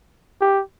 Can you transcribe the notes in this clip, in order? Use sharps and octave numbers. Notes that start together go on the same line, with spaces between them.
G4